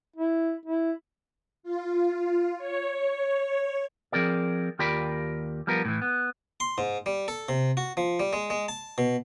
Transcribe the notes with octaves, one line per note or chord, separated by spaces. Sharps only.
E4
E4
F4
C#5
F3 C4 G#4 A#4 D5
D#2 F4 G4 A#4 D5 B5
F3 G3 B3 A#4
A2 E3
B3
C6
G#2
G3
A4
C3
F#4
F3
G3
G#3
G#3
A5
B2